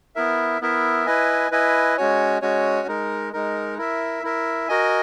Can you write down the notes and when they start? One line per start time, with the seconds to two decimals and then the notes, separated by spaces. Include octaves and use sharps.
0.16 B3 E4 A#4 E5
0.61 B3 E4 A#4 E5
1.06 E4 B4 D#5 G#5
1.51 E4 B4 D#5 G#5
1.97 G#3 C#4 F#4 C#5 G#5
2.42 G#3 C#4 F#4 C#5 G#5
2.88 G#3 D#4 A#4
3.33 G#3 D#4 A#4
3.78 E4 A#4 E5
4.23 E4 A#4 E5
4.69 F#4 A#4 D#5 G#5